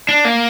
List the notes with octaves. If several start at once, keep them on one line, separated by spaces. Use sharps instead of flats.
D4
A#3